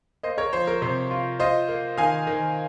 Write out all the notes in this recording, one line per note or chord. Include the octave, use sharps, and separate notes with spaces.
A#3 C5 D#5
A#4 C#5
F3 C5
A#4
C3 C5
F4
F4 C5 D#5
A#3
D#3 F5 G#5
D#3